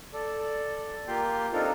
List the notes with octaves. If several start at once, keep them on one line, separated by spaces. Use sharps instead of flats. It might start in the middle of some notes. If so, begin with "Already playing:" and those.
A4 D5
A#3 F4 G4 G5 C6
C4 D4 D#4 F4 A4 A#4